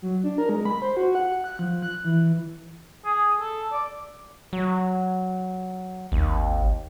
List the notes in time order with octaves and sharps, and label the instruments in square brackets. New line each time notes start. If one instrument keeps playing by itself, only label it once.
[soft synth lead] F#3
D4
A#4
G#3
B5
C5
F#4
F#5
F#6
F3
F#6
E3
[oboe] G#4
A4
D5
[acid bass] F#3
[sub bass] G#1 [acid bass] D#2